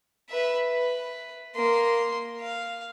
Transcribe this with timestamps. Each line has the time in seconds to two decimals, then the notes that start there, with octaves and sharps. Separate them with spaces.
0.29 B4 E5
0.72 B4
1.56 A#3 C6
2.40 F5